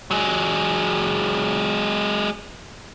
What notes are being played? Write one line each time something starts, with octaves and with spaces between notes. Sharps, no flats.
F#3 G#3